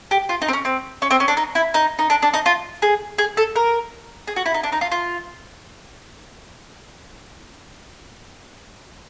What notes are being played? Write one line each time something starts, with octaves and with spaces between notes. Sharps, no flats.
G4
F4
D#4
C4
C#4
C4
C#4
C4
C#4
D4
D#4
E4
D#4
D#4
D4
D4
D#4
F4
G#4
G#4
A4
A#4
G#4
F#4
E4
D#4
D4
D#4
F4
F4